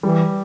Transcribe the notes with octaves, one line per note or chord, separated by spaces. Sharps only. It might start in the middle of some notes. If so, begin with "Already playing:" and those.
E3 G3